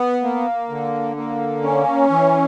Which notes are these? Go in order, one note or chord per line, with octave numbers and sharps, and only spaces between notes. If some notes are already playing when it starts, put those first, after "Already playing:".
Already playing: B3
A#3
D3
A#3
C#4
E3